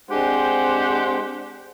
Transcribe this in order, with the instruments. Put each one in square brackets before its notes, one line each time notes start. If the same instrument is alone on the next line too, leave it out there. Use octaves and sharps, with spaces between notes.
[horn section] G#3 C4 D4 G4 C5 F#5